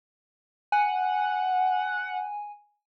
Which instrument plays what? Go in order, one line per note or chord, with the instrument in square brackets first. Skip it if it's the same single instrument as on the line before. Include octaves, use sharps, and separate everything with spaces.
[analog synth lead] F#5 [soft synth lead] G#5